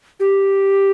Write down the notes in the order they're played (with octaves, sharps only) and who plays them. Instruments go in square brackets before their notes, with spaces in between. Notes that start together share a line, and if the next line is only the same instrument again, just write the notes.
[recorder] G4